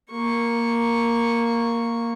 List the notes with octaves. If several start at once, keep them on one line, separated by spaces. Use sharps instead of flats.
A#3 C#6